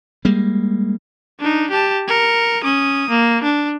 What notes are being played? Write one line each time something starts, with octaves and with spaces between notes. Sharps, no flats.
G3 G#3 A#3
D4 D#4
G4 A5
A#4 C#7
C#4 D#6
A#3
D4